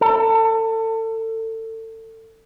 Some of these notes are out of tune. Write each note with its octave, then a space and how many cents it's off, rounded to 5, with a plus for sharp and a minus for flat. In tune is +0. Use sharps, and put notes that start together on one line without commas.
A4 +30